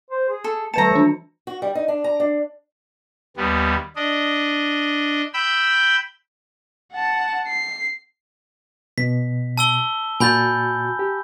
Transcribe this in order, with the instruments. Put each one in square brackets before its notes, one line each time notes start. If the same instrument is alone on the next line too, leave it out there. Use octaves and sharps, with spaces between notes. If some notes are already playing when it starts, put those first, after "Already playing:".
[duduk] C5
G#4
[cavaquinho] A4
[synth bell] D#3 B4 C#7 [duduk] A3 [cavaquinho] A5 A#5
[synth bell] E3 D4
[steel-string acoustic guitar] F#4
G3
D#4
D4
A#5
D4
[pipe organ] D#2 G3 B3
D4 D#5
G5 B5 E6 G6
[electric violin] F#5 A5
C7
[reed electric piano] B2 [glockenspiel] B6
[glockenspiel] A5 E6 G7
[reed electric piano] A#2 F#4 A6 [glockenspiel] G#5 B5 G6
[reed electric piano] G4